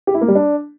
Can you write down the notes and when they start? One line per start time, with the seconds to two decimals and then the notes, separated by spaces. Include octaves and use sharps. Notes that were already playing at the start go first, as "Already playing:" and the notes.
0.07 G4
0.14 E4
0.21 A#3
0.28 G3
0.35 D4